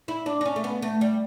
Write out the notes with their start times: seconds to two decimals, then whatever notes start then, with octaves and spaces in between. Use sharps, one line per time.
0.08 E4
0.26 D4
0.41 D4
0.45 C#4
0.56 A3
0.64 B3
0.82 A3
1.01 G3